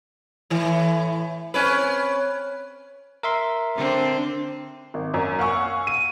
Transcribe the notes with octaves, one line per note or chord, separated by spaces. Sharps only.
A2 E3
C4 C#4 B4
A#4 E5 C6
D3 C4 D4
G#1
F#2
F5 F#5 G#5 C#6 E6
D#7